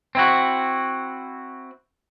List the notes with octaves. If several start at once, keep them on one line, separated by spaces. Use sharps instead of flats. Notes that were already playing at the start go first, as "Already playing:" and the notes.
C4 E4 F#4